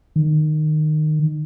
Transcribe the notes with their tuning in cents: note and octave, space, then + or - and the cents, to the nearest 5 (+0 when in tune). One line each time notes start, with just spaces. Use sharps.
D#3 -20